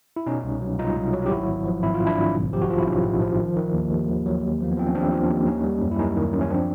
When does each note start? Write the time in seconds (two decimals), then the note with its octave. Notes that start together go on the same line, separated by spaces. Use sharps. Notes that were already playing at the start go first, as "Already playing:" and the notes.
0.16 E4
0.26 B2 C#4 D#4
0.44 C2
0.62 F#3
0.79 C2 D#4 F4
0.96 C2
1.13 F#3
1.26 G4
1.31 G#1 E4 F#4
1.48 G#1
1.66 F3
1.83 G#1 E4
1.94 F4
2.00 G#1
2.07 D4 E4
2.18 G#1
2.35 B1
2.53 F3 G4
2.62 F#4
2.70 F3 F4
2.79 E4
2.86 B1 C#4 D#4
3.04 A2
3.21 F3
3.39 D#3
3.56 D#3
3.74 D#2
3.90 D#2
4.08 D#2
4.26 F#3
4.43 D#2
4.60 F3 A#3
4.71 B3
4.77 F3 C4
4.87 C#4
4.95 D#2 C4 D4
5.12 F3
5.30 D#2
5.46 D#3 C#4 D#4
5.64 G3
5.82 F#2
5.91 E4
5.99 F#2 C#4 D#4
6.16 D#3
6.34 F#2
6.41 C#4
6.51 F3 C4 D4